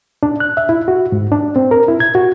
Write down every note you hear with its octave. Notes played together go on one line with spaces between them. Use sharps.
D4
F#6
E5
E4
F#4
G#2
D4
C4
A#4
E4
G#6
F#4